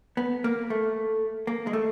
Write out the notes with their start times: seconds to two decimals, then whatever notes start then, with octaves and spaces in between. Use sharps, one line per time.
0.17 B3
0.44 A#3
0.70 A3
1.47 A#3
1.67 G#3
1.73 A3